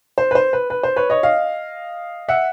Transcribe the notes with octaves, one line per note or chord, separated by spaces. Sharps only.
C5
B4
C5
B4
B4
C5
B4 C#5
C#5 D#5
D#5 F5
E5 F#5